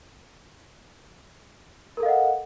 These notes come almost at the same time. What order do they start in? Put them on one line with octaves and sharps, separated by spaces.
A#4 A4 F5 D#5 F#5